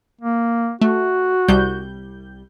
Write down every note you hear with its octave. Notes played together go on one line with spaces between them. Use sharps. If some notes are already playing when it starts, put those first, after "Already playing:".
A#3
A3 F#4
C2 G3 G6